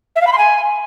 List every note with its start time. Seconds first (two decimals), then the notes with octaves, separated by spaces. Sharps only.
0.16 E5
0.21 F5
0.27 B5
0.32 C6
0.38 G#5